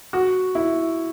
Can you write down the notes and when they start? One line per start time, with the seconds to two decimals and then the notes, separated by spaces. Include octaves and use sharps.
0.13 F#4
0.55 E4